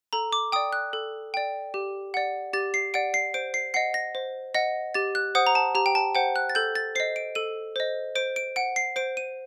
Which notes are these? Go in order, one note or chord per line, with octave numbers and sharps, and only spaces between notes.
A4 A#5
D6
D5 G5 D#6
F#6
A4
D5 G5
G4
D5 F#5
G4 A6
C7
D5 F#5 D7
C7
C5 D7
C7
D#5 F#5 C7
A#6
C5
D#5 F#5 A#6
G4 A6
F#6
C5 F#5 D#6
A#5
A5
G4 A#5
G5
A5
C5 F#5 G5
F#6
A6
A4 G6
A6
C5 D#5 C7
D7
A4 D#7
C5 D#5
C5 D7
D7
F#5 D7
C7
C5 D7
D#7